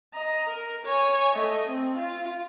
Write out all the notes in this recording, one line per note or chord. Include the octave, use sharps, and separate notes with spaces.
D#5 A#5
A#4
C#5 G#5
A3 D#5
C4
F4